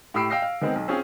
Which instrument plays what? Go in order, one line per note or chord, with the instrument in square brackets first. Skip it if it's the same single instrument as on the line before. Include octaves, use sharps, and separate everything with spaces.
[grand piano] A2 G4 B5 E6 C7 D7
F5 G5 E6 A#6 C7
F5
D#3 G#3 B3 C4
B1
C4 C#4 F4 G#4